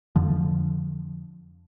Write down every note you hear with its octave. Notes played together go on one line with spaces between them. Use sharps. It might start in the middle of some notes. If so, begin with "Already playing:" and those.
F2 D3 F3